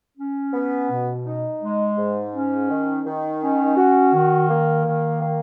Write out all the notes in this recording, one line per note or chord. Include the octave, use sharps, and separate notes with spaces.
C#4
B3
B2
D#4
G#3
G#2
C#4
D#3
D#3
C#4
F#4
D#3
A#3
D#3
A#3